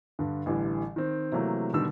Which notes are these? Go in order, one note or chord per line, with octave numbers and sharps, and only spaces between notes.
G2 D3
A1 D3 E3 G3
D#3 C4
C3 E3 F#3 A3 A#3
B2 D3 D#3 G3 E6